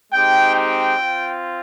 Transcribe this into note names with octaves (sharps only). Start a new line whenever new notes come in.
G#3 C4 D#4 G4 G5
G5
C4 F4